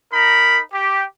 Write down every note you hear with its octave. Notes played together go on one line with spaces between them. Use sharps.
D#4 A#4 B5
G4